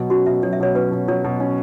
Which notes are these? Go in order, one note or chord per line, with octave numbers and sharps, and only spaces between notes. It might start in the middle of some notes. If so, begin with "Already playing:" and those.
Already playing: B2 F#3
C#4 F#4
B2 E5
F#3 C#5
E5
B2 C#5
C#4 B4
B2
F#3 C#5
B2
C#4